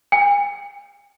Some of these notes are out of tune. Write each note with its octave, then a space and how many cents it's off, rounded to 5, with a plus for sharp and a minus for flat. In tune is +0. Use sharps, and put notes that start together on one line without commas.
G#5 -40